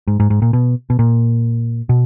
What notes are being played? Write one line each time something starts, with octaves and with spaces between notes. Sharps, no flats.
G#2
G#2
G#2
A#2
B2
B2
A#2
B2